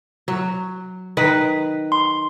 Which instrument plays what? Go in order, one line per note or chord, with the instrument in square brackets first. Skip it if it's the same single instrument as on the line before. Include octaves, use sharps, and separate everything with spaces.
[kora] F#3
D#3 B4
[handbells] C6